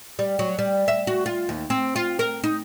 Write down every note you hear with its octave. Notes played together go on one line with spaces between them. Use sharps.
G3
F#3
G3
E5
F#4
F4
D#2
C4
F4
A#4
D#4